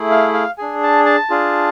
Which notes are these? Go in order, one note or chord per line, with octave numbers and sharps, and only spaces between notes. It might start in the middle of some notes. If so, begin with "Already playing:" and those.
Already playing: A3 E4 G#4
F5
F5
D4 G#4 G#5
A5
A5
D4 F4 G#4